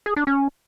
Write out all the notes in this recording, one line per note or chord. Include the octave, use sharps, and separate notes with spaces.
G#4
D4
C#4